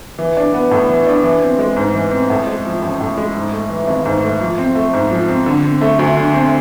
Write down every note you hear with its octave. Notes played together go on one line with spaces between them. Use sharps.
E3
D4
B3
A2
E3
D4
E3
C4
G#3
G#2
E3
C4
A2
G#3
F3
A1
A2
G#3
G#2
A3
E3
G#1
G#2
A3
F3
C4
A3
G#2
F3
C4
D3
C4
A3
D2
D3
C4